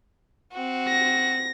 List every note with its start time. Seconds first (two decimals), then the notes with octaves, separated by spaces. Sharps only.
0.52 C4 F#4
0.89 A#6